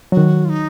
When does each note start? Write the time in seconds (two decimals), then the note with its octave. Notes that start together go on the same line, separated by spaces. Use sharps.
0.12 D#3 F#3 F#4
0.45 F4
0.49 D#4